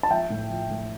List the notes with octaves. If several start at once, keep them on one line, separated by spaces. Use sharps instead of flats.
A5
F3 E5 G5
A2
F3
A2